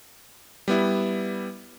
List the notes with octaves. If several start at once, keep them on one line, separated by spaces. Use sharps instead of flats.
G3 B3 E4